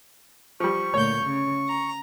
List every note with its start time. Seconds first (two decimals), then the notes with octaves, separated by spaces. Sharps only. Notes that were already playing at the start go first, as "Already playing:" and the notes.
0.60 F3 G3 C#6
0.94 D2 A#2 C#5 G6
1.24 C#3
1.68 A#5